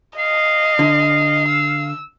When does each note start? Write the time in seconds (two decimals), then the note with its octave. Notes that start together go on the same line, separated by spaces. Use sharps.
0.19 D#5 F5
0.79 D3
1.48 E6